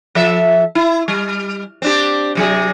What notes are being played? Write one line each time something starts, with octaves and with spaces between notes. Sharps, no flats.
F3 A4 E5
E4
G3
C4 D4 G4
C3 F#3 G#4